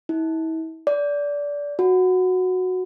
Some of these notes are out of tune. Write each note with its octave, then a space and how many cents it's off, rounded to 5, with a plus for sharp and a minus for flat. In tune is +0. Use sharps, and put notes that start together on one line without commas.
E4 -40
D5 -20
F#4 -10